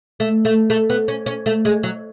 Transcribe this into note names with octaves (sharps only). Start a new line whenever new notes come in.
A3
A3
A3
B3
C#4
C#4
A3
G#3
F#3